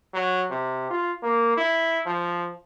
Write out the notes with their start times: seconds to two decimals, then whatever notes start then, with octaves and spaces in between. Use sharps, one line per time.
0.14 F#3
0.50 C3
0.90 F4
1.23 A#3
1.57 E4
2.06 F3